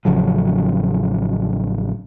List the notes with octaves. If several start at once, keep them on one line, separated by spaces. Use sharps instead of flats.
A1 C#3 F3 F#3